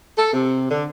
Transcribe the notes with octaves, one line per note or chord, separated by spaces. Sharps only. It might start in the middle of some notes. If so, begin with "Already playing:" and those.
A4
C3
D3